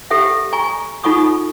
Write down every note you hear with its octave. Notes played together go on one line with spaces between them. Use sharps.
G4 A4 E5 F#5
G#5 A#5 C#6
D#4 F4 A4 F#5 C#6 D#6